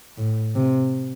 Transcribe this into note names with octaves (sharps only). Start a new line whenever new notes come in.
A2
C3